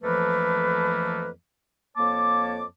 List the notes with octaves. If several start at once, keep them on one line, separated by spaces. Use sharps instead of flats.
F2 E3 F3 A3 A#3 B4
F2 A#3 C#5 A5 D6